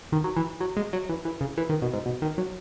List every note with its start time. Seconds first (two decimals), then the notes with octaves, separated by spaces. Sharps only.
0.12 D#3
0.24 F#3
0.37 E3
0.60 F#3
0.77 G#3
0.93 F#3
1.09 E3
1.25 E3
1.41 C#3
1.58 E3
1.70 D#3
1.82 B2
1.94 G#2
2.06 B2
2.22 D#3
2.38 F#3